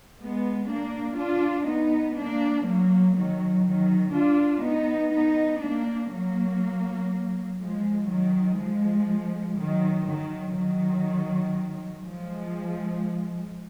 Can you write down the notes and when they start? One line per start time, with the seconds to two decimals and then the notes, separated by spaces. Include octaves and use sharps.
0.20 G#3 B3
0.70 A#3 D4
1.19 D4 F4
1.68 B3 D#4
2.18 A#3 D4
2.66 F#3 A#3
3.16 D#3 F#3
3.66 D#3 F#3
4.14 D4 F4
4.64 B3 D#4
5.13 B3 D#4
5.62 A#3 D4
6.12 F#3 A#3
7.60 F3 G#3
8.09 D#3 F#3
8.58 F3 G#3
9.57 D#3 F#3
10.06 D#3 F#3
10.55 D#3 F#3
12.04 F3 G#3